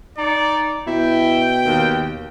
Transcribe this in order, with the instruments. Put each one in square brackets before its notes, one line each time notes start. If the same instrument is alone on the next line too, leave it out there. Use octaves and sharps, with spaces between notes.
[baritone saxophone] D#4 [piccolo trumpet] D5
[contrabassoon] B2 [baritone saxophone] E4 [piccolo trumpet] G5
[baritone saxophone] D#2